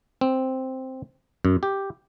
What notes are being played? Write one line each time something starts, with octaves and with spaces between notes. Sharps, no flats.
C4
F#2
G4